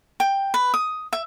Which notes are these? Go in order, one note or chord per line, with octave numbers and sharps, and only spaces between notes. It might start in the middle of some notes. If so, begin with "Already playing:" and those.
G5
B4
D#6
E5